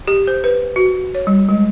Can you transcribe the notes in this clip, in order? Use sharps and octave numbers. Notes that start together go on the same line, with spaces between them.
G4
C5
B4
F#4
C#5
G3
G#3